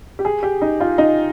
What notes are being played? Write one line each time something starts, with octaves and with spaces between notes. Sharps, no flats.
G4
G#4
G4
D#4
F4
D#4